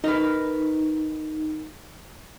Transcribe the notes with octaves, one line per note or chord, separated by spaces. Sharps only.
D#4 A#4 B4